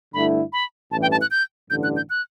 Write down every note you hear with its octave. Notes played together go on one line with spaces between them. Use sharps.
G2 D3 A3 E4 B5
B5
A1 G2 E3 A5
G5
A5
F#6
G6
A1 G2 D3 G6
F#6
G6
F#6